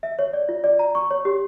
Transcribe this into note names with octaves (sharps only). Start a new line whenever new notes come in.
E5
C#5
D5
F4
D5
A#5
C#6
C#5
G4